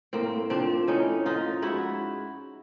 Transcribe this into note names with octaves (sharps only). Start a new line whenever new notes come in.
A2 A#3 C4
F3 C4 D4
A2 C#4 D#4
F3 D#4 F4
G#2 E4 F#4